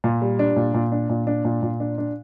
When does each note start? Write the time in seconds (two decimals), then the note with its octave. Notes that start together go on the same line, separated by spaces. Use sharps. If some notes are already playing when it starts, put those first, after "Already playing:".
0.04 A#2
0.22 G3
0.39 D4
0.56 A#2
0.74 A#2
0.92 D4
1.10 A#2
1.27 D4
1.45 A#2
1.63 A#2
1.80 D4
1.98 D4